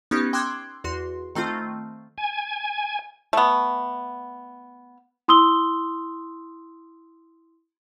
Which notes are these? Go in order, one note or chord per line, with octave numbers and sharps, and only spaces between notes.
B3 C#4 D#4 G4
G5 C6 D6 E6 F#6 G#6
E2 F#4 C6
D#3 A3 C4 F4
G#5
A3 B3
E4 C6 D#6 E6 G7